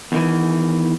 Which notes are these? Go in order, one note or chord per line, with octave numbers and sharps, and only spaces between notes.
E2 D#3 E3